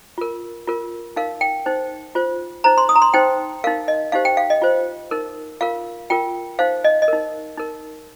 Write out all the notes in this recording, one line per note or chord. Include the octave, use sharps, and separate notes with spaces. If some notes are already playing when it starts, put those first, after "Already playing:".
F4 A#4
F4 A#4
D#4 A#4 F5
G5
D#4 C5
F4 C5
D#4 C5 A#5
C6
D#6
A#5
C6
D#4 C5 G5
D#4 A#4 F5
D#5
D#4 G4 C5 F5
G5
F5
D#5
F4 C5
D#4 A#4
F4 A#4 F5
F4 A#4 G5
D#4 C5 F5
D#5
D#5
D#4 A#4
D#4 A#4